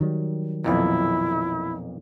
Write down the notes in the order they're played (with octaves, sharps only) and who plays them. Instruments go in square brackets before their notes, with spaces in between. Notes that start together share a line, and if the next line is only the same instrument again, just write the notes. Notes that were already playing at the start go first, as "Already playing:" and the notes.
[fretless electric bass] D#3 F#3 G3
[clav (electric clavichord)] B1 F2 A#2 [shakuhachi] E4